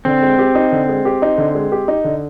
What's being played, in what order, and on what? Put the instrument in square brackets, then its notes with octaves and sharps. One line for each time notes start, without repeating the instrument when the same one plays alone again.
[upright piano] D3 [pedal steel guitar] C4
[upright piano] G#3
G4
D#4
D3
G#3
G4
D#4
D3
G#3
G4
D#4
D3